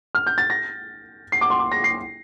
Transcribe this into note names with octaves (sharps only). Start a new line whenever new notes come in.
F6
G6
A6
A#6
C7
D6
C6
D6
A#6
C7